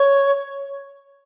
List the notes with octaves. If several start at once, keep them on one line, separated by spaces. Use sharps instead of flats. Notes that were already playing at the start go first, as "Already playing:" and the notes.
Already playing: C#5